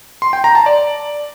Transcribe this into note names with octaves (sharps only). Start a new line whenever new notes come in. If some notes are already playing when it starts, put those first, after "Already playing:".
C6
G5
A#5
A5
D5